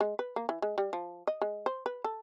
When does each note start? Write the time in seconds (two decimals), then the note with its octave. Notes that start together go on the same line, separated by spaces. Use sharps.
0.01 G#3
0.19 B4
0.36 A#3
0.49 E3
0.62 G#3
0.78 G3
0.93 F3
1.27 D#5
1.42 G#3
1.66 C5
1.86 B4
2.04 A4